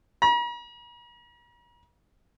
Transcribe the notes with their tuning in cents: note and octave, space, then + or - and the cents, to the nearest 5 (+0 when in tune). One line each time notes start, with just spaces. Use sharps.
A#5 +45